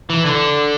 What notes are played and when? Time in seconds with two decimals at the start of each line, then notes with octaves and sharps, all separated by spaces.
0.10 E3
0.25 D3